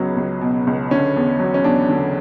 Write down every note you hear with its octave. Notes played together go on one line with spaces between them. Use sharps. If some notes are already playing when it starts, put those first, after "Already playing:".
Already playing: C#2 F#3 B3 C#4
C#2
B2
C#2
D3 C#4
E2
F#3
C#4
E2 D4
D3